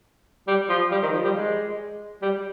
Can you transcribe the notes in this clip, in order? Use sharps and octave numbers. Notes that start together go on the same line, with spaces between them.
G3
F3
G3
D#3
F3
G3
G#3
G3